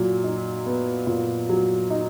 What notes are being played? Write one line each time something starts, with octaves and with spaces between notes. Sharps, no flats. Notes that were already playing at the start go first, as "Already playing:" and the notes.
Already playing: A#2 F#3
D#4
B3
A#2
F#3
D#4